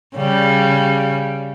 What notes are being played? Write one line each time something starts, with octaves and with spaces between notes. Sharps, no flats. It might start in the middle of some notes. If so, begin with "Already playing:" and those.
C#3 G3